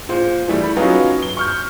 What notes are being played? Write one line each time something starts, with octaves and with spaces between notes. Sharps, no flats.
A#2 C5
E3 G3 A3
B5
F#3 B3 C#4 D#4 F4
G7
C#6 F6 G6